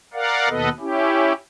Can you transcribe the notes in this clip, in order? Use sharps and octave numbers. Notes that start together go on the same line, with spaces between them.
A#4 D5 F5 F#5
D#2 B2 B3 A4 B4 D#5
C#4 E4 G4